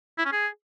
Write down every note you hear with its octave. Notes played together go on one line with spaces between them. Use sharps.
E4
C#4
G#4